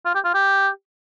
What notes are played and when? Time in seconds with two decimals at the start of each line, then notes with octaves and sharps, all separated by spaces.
0.05 F4
0.15 G4
0.24 F4
0.34 G4